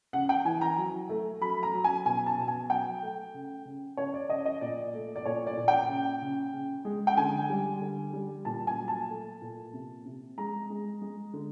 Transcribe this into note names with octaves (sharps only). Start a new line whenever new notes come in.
C#3 F#5
G5
E3 G#5
A#5
F#3
A3
F#3 B5
A#5
F#3
G#5
B2 G#5
A5
B2
G#5
F#3 G5
A3
C#3
C#3
C#3 C#5
D5
C#3 D#5
D#5
A#2 D5
A3
D5
A#2 C#5
D5
A#2
G5
C#3
C#3
C#3
G#3
G5
D3 G#5
G3
D3
G3
A#2 A5
G#5
F#3
A5
A3
A#2
C3
C3
G#3 A#5
G#3
G#3
D3